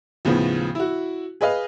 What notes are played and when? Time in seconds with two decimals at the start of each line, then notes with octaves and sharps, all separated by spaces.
0.25 D#2 A2 C#3 F3 B3
0.75 E4 F#4
1.41 G#4 B4 D#5 F5